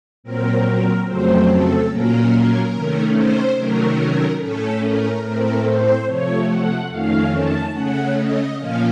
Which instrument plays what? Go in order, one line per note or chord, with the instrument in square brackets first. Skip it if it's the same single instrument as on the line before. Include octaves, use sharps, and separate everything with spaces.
[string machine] A#2 F#3 C4 A#4
F2 C#3 F#3 A3 C4 C5
A4
A#2 F#3 A#3 C#4 A#4
C3 D#3 A3 C#4
C5
C3 D#3 F#3 A3 C#4 A#4
A2 A3 C#4 A4
A#4
A2 A3 C4 A#4
C5
C3 F3 A3 C#5
F#5
F2 D#3 A3 C#4 F5
A5
C#3 A3 C#4 F#5
D#5
A#2 F3 A#3 C#4 F5